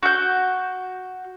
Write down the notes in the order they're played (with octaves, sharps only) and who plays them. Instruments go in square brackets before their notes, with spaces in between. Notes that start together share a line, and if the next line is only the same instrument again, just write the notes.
[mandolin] F#4 G6